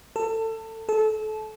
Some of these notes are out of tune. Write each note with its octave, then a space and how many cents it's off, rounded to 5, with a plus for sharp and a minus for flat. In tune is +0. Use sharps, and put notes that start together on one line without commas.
A4 +25
A4 -25